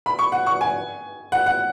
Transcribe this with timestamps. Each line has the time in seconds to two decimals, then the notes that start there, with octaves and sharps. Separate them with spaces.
0.06 B5
0.19 C#6
0.32 F#5
0.46 C#6
0.61 G#5
1.32 F#5
1.46 F#5